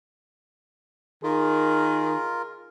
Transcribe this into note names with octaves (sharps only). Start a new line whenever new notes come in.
D#3 F4 G#4 A#4